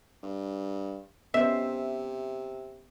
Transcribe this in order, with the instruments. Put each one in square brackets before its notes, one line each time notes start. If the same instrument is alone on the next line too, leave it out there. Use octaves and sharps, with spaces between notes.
[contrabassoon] G2
[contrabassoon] C3 [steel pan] B3 C#4 C5 [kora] E5